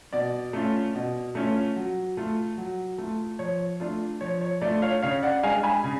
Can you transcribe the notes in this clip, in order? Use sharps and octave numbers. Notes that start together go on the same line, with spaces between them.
B2 D5
A3 C#4 F4
B2
A3 C#4 F4
F#3
A3 F4
F#3
A3 F4
F3 C#5
A3 D4 F4
F3 C#5
C#5
A3 D4 F4 D5
C#5 F5
C#3 C#5 F5
D5 F#5
G#3 D4 F5 G#5
G#5 B5
C#3